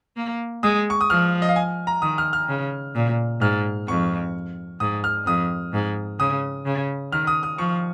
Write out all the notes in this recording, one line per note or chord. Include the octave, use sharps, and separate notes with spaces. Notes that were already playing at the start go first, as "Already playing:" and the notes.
A#3
G#3 D#6
C#6
D#6
F3 F6
D#5
F5
G#5
A#5
D#3 D#6
F6
F6
C#3
A#2
G#2 F6
F2 C#6
G#2 D#6
F6
F2 D#6
G#2
C#3 D#6
C#3
D#3 F6
D#6
D#6
F3 C#6